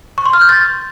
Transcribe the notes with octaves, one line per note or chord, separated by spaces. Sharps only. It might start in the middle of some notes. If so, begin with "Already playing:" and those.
C#6
C6
F6
G6
A6